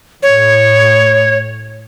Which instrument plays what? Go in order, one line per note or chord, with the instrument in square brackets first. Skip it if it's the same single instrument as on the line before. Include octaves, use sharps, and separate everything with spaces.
[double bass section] A2 [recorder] C#5